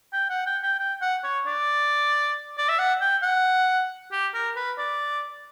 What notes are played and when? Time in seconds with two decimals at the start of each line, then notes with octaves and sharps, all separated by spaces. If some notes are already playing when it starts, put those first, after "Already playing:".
0.13 G5
0.30 F#5
0.46 G5
0.63 G5
0.79 G5
1.01 F#5
1.24 C#5
1.46 D5
2.58 D5
2.69 E5
2.79 F#5
3.01 G5
3.23 F#5
4.12 G4
4.34 A#4
4.56 B4
4.78 D5